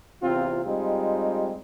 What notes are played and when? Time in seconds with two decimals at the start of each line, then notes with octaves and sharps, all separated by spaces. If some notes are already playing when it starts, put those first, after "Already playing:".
0.22 E2 C3 C4 F4
0.65 G3 G#3 C4 D#4 F4 G4